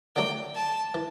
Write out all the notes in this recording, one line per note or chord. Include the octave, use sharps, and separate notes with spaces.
D3 F#3 A3 D4 G5
A5
E3